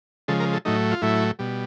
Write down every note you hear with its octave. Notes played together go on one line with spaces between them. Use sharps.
C#3 F3 G#3 A4
A#4
A4
A2 F#3 A3 D#4
F4
A2 F#3 A3 E4
B2 G3